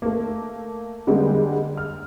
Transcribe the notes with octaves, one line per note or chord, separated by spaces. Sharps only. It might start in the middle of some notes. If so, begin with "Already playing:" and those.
A3 A#3
D3 G3 G#3 A#3 B3
F6